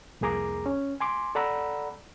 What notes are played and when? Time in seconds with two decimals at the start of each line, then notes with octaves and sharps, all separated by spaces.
0.21 C2 F2 A#3 G#4 A#5 D6
0.66 C#4
1.00 G#5 C6 D6
1.35 A4 D5 F#5 A#5 B5 E6